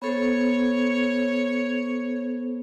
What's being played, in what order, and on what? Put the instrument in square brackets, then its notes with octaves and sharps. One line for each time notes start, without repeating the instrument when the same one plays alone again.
[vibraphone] B3 A4 C5 [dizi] C#5